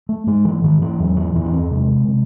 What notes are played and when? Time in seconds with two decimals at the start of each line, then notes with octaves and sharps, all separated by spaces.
0.09 A3
0.27 G#2 G#3
0.45 E3
0.64 G#2 D#3
0.82 E3
0.99 E2 F#3
1.17 E3
1.35 E2 E3
1.45 C#4
1.53 C4
1.71 C3 G#3
2.08 C3